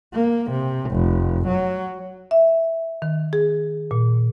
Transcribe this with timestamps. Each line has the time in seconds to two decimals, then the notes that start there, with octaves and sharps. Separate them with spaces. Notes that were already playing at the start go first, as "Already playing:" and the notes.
0.14 A#3
0.51 C3
0.91 F1
1.48 F#3
2.31 E5
3.02 D#3
3.33 G#4
3.91 A#2